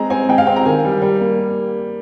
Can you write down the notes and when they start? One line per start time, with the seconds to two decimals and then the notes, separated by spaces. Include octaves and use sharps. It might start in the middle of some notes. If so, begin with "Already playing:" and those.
Already playing: G#3 C4 A#5
0.10 C4 G#5
0.29 G#3 G5
0.38 F5
0.47 C4 G5
0.56 A#5
0.65 D#3 G#5
0.84 G3
1.02 G3
1.20 A#3